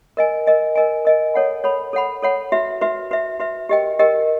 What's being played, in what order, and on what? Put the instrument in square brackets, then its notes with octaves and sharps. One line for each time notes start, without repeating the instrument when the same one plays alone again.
[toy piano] A#4 D#5 G#5
A#4 D#5 G#5
A#4 D#5 G#5
A#4 D#5 G#5
A4 C#5 F#5 B5
A4 C#5 F#5 B5
A4 C#5 F#5 B5
A4 C#5 F#5 B5
F#4 B4 E5
F#4 B4 E5
F#4 B4 E5
F#4 B4 E5
G4 A#4 D#5 G5
G4 A#4 D#5 G5